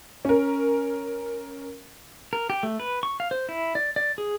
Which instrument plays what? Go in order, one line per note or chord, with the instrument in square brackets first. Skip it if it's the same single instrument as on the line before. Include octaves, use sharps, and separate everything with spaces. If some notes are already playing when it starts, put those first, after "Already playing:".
[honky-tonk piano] C#4 A#4
[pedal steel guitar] A#4
G4
A3
B4
C#6
F5
C5
E4
D5
D5
G#4